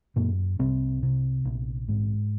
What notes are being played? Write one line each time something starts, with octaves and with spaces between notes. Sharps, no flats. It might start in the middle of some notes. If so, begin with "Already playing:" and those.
F#2 A#2 A#3
C2 C3 C4
C3
A#1
G#2